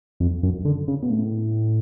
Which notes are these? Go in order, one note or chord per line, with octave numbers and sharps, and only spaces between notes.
F2
F#2
D3
C#3
B2
A2